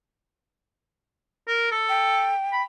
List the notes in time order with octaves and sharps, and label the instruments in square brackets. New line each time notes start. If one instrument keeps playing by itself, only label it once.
[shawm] A#4
A4
[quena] G5
[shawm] B5